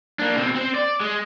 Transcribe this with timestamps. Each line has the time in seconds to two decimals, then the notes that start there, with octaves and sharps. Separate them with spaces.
0.19 A#3 D4
0.37 B2 C4
0.55 C4 C5
0.75 D5
1.01 G#3